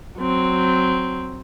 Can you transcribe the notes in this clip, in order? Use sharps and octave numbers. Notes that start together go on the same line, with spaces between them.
F#3 C4